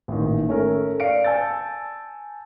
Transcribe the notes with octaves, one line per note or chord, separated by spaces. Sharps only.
A1 A#2 D#3
A3 C#4 A4 A#4
D5 F5 C#7 D7
G#5 A5 E6 G6 A6